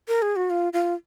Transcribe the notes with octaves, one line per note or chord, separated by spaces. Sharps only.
A#4
G#4
F#4
F4
F4